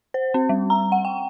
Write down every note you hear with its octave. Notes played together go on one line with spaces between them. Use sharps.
C5
C4
G3
A#5
F#5
G5